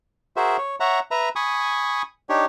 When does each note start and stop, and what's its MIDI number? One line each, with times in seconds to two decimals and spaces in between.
0.36 0.57 66
0.36 0.57 68
0.36 0.57 70
0.36 0.57 72
0.36 0.57 76
0.58 0.76 73
0.80 1.00 73
0.80 1.00 76
0.80 1.00 78
0.80 1.00 82
1.11 1.29 71
1.11 1.29 76
1.11 1.29 82
1.36 2.02 80
1.36 2.02 83
1.36 2.02 85
1.36 2.02 87
2.29 2.45 62
2.29 2.45 63
2.29 2.45 67
2.29 2.45 73